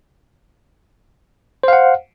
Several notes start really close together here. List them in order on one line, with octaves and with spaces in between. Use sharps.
C5 F5 F#5